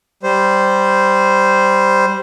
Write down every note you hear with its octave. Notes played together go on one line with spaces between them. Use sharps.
G3 C5